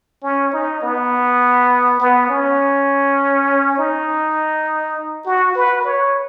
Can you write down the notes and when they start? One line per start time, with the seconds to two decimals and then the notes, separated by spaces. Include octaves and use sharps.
0.23 C#4
0.53 D#4
0.82 B3
2.00 B3
2.30 C#4
3.78 D#4
5.26 F#4
5.56 B4
5.85 C#5